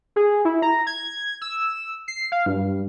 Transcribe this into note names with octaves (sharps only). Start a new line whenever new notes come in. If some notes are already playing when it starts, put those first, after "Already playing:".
G#4
E4
A#5
G#6
E6
C7
F5
G2